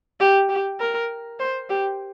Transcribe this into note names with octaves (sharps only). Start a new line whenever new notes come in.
G4
G4
A#4
C5
G4